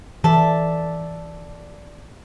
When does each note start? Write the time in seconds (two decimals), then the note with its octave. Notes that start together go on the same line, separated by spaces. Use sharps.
0.24 E3 A4 D5 E5